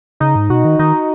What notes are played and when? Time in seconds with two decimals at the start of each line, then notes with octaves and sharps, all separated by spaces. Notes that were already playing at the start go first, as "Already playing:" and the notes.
0.20 C#3 D#4
0.36 G#2
0.50 B2 F#4
0.65 D#3
0.79 D#3 D#4